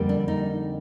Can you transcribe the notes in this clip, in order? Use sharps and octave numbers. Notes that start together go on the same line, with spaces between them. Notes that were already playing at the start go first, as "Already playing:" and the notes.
Already playing: F2 D3 G3 A#3
D4
D#4